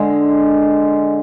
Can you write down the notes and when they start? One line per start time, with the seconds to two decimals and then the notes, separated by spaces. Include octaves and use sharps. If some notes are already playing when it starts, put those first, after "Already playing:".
Already playing: D3 G#3